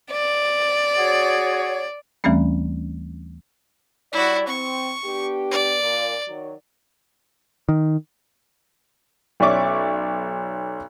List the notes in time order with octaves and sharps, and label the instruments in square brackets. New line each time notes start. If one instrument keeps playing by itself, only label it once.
[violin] D5
[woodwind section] F#4 G#4 C#5
[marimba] D#2 E3 G3 A3 C4 C#4
[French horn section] G3 C#5 D5 [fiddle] E4 F#4
[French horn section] C4 [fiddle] C#6
[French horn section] B3 D4 G4
[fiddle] D5
[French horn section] A#2
D#3 F#3
[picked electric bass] D#3
[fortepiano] B1 C#4 D5 E5 C#6 D6